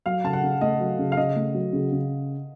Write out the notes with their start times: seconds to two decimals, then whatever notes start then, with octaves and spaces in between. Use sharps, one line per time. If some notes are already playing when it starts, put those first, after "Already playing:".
0.06 F#3 F5
0.24 C#3 A5
0.33 F#5
0.43 C#3
0.61 A3 D#5
0.80 F#3
0.99 C#3
1.12 F5
1.17 C#3 D#5
1.36 A3
1.54 F#3
1.73 C#3
1.92 C#3